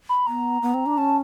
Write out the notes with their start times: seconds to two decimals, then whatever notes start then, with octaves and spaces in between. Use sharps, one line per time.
0.09 B5
0.27 B3 A#5
0.62 B3
0.74 C4
0.86 D4
0.98 C#4 A5